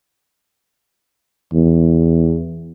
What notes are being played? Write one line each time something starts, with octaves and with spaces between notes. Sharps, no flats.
E2